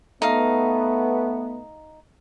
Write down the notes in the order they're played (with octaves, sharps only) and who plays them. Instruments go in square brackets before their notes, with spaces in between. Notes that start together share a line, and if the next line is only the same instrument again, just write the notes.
[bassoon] A3 [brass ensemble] B3 [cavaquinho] D#4 F5